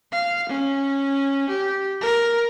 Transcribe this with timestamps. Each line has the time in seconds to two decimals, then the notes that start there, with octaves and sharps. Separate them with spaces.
0.12 F5
0.49 C#4
1.50 G4
2.01 A#4